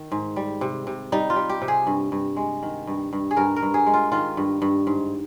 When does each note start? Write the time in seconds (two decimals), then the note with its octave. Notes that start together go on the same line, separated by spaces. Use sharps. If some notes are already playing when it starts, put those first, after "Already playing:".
Already playing: D#3
0.12 G#2
0.36 G3
0.61 C3
0.87 C3
1.12 G3 D#4
1.30 F4
1.36 G3
1.49 G4
1.62 C3
1.68 G#4
1.87 G2
2.12 G2
2.36 G#3
2.63 D#3
2.87 G2
3.13 G2
3.31 G#4
3.37 G2 A#4
3.56 A#4
3.62 G2
3.74 G#4
3.87 G#3
3.94 F4
4.12 D#3 F4
4.37 G2
4.62 G2
4.87 G#2